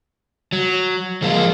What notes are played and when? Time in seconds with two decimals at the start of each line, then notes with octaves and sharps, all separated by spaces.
0.53 F#3
1.22 F3 G#3 A#3 F4